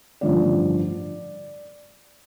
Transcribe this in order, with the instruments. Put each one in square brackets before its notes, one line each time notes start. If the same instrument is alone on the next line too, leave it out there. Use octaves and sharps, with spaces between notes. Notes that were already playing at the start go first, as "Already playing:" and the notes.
[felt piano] A1 G2 D3 F3 D5